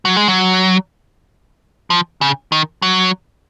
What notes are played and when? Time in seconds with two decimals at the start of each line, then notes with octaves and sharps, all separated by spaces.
0.05 F#3
0.16 G#3
0.28 F#3
1.90 F3
2.21 C#3
2.52 D#3
2.82 F#3